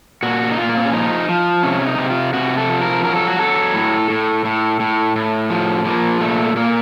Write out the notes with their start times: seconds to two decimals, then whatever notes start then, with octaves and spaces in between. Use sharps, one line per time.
0.23 A#2 F#4
0.51 D#4
0.58 A#2 F4
0.69 A#3
0.77 C4
0.84 C#4
0.93 F3 D#4
1.29 F3
1.63 C3 C#4
1.86 D#4
1.98 C3
2.10 F4
2.33 C3 F#4
2.57 A4
2.69 F3
2.81 A#4
3.04 F#3 A#4
3.16 A4
3.27 F#4
3.39 F#3 A4
3.74 A2
4.10 A2
4.45 A2
4.80 A2
5.16 A2
5.50 F3
5.85 F3 A#3
6.21 A#2 A3
6.56 A#2 A#3